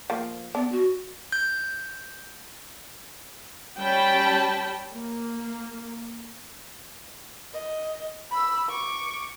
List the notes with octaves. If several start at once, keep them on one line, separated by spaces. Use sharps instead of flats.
F3 A#3
B3 D4
F#4
G6
G3 C#4 G5 A5 B5
A#3
D#5
B5 E6
C#6 D6